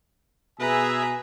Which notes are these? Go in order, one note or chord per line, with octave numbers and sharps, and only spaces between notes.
B2 G#4 B4 E5 G#5 A#5